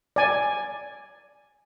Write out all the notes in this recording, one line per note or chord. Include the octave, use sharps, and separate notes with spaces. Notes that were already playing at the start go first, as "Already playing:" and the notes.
D5 G#5